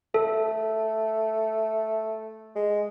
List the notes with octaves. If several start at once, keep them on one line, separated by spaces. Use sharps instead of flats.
A3 A4
G#3